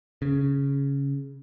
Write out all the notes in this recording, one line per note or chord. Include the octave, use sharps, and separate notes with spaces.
C#3